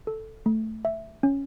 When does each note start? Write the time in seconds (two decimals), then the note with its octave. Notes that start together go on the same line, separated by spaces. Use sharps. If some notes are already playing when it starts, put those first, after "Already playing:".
0.07 A4
0.46 A3
0.85 E5
1.23 C#4